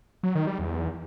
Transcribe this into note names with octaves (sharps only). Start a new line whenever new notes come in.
F#3
D#3
G3
E2